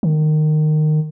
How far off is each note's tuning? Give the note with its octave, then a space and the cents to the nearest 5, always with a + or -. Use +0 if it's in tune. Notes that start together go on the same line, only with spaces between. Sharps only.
D#3 -20